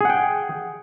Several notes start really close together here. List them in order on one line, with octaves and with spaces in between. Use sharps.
G#4 F#5 G5